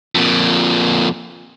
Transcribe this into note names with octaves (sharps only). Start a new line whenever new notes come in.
F2 A#2